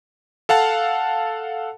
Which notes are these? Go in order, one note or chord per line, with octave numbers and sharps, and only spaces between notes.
A4 F5 F#5 A5